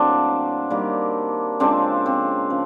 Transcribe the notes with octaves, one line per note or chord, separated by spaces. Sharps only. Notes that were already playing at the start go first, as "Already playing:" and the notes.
Already playing: A2 F#3 A#3 C4 D4
D#3 G3 A#3
C#3 F3 G#3 C4 D4
C4
C#3 F3